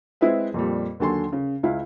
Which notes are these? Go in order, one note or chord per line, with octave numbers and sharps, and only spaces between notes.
G#3 C4 E4 G#4 B4 E5
F2 A#2 G3
D#2 D3 F#3 A4 G#5 C6
C#3
C#2 E4 F5